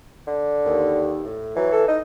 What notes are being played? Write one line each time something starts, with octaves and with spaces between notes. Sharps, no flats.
D3
D#2
A2
E3 F#3
A4
D#4 D#5